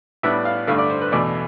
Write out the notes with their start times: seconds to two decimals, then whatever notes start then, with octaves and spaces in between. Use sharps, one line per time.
0.23 A2 G3 B3 D4 E5
0.45 F5
0.67 G2 D3 A3 D4 F5
0.78 D5
0.90 C5
1.01 B4
1.12 E2 B2 A3 D5